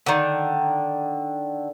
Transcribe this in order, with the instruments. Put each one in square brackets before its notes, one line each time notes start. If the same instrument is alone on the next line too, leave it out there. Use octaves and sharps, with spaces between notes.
[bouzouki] D3 D#3